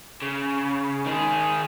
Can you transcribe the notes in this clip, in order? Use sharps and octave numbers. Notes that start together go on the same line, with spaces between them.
C#3
D#3 G#4